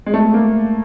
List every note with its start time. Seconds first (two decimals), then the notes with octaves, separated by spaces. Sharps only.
0.06 G#3
0.14 A3
0.34 A#3